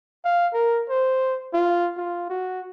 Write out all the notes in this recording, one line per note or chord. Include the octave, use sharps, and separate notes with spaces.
F5
A#4
C5
F4
F4
F#4